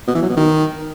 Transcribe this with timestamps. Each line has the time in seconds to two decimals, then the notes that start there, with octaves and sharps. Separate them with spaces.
0.08 B2
0.15 E3
0.22 F#3
0.30 B2
0.37 D#3